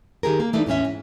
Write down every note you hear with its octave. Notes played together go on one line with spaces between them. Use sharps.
D#3 G4 G#4 A#4
A#3
E3 A3 A#3 D4 D#4
E2 A2 F#3 C#4 E5
G#2